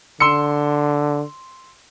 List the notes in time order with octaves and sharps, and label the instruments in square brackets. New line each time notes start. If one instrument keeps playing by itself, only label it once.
[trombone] D3 [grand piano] C6 E6 C#7